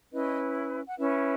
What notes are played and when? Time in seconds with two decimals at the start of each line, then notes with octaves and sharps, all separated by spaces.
0.12 C#4 E4 B4 D#5
0.88 F#5
0.97 C#4 E4 B4 E5